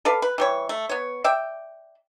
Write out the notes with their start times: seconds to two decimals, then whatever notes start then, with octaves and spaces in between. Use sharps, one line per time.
0.05 A4 B4 D5 F5
0.22 B4
0.38 E3 G3 C#5
0.69 A3
0.89 B3 C#5
1.24 D5 E5 G5